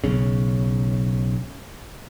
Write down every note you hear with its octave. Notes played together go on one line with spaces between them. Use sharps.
B1 C#3